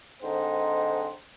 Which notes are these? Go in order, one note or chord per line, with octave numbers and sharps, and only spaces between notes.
G#2 D3 C4 D#4 C5